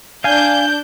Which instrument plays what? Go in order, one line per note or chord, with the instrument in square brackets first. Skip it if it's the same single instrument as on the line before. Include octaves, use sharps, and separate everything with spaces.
[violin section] D4 G6 [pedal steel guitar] F5 G#5